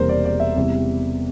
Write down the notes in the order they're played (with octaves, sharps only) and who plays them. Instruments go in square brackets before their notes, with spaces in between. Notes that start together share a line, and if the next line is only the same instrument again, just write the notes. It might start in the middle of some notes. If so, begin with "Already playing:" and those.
Already playing: [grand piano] E1 E2 C3 G3 A#3 A#4 C5
D5
D5
E5
E2 C3 G3